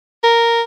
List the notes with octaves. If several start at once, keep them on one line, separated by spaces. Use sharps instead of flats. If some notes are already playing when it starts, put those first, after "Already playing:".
A#4